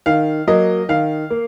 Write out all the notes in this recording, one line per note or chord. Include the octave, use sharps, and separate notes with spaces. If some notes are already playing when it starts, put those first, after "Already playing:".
D#3 F5
F#3 A#3 D#5
D#3 F5
A#3